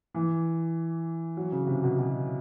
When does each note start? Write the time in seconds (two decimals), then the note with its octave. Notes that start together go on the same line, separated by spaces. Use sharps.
0.15 E3
1.37 F#3
1.52 C#3
1.67 C3
1.83 B2
1.98 B2